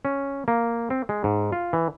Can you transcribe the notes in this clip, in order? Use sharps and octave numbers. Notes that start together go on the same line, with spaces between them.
C#4
A#3
C4
G#3
G#2
F4
E3